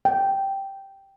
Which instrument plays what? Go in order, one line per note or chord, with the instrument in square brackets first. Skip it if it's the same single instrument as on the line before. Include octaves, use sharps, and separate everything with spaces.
[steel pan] G5